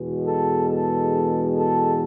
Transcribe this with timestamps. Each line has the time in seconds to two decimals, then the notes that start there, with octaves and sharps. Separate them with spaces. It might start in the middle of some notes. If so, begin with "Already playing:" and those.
Already playing: E2 B2 G#3
0.27 A4
0.69 A4
1.54 A4